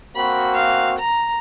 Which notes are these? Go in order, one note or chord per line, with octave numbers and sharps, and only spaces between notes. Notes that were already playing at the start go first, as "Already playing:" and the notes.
A#3 C4 F#4 B5
F5
A#5